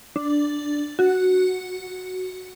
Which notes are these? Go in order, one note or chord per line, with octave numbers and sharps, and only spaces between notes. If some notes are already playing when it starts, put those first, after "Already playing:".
D4
F#4